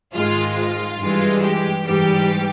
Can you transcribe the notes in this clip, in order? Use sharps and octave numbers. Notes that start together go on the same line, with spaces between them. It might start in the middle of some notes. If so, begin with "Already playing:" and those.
G#2 D#3 G#3 F4
F4
G2 E3 G#3
G4
G#2 E3 G3 G4